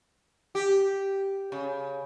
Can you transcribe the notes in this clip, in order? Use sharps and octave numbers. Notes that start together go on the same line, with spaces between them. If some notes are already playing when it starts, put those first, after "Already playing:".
G4
C#3